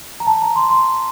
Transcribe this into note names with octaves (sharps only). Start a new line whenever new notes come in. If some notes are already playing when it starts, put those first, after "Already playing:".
A#5
A5
A#5
C6
C6